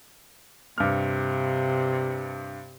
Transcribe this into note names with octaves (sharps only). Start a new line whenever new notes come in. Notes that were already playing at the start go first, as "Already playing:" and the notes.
G2 C3 F6